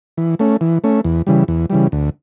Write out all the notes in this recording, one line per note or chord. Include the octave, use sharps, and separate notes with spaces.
E3
A3 C#4
E3
A3 C#4
E2
C#3 E3 G3
E2
C#3 E3 G3
D2